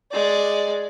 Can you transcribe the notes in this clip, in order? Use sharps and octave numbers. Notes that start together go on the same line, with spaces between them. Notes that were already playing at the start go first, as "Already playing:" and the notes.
G#3 D5